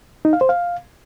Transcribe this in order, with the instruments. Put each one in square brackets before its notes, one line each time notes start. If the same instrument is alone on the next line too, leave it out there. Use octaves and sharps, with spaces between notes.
[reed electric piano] D#4
F5
C5
F5